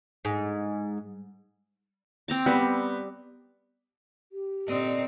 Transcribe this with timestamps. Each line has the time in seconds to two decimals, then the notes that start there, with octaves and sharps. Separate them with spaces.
0.25 G#2
2.28 C4 A#5 D6
2.46 G3 B3
4.32 G4
4.68 A#2 D3 C4 D#4 D#5